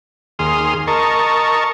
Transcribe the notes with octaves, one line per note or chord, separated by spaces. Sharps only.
D#2 G#4 C6 D#6 F6
A#4 D#5 A5 C#6